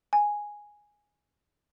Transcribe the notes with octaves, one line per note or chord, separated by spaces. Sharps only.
G#5